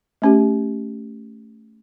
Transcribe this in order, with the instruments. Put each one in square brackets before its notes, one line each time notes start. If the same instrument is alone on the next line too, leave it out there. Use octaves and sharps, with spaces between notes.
[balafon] A3 C#4 G4